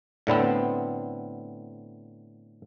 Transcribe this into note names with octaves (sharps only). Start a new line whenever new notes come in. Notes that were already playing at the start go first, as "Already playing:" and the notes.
A2 D3 B3 C4